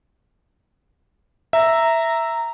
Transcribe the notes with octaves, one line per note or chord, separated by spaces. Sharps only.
E5 A#5